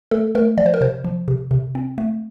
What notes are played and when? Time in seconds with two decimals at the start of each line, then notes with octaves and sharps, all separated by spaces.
0.11 A3 A4
0.35 A3 A#4
0.58 F3 D5
0.66 C5
0.74 A#4
0.81 C3 C5
1.04 F3
1.28 C3
1.51 C3
1.75 C4
1.98 A3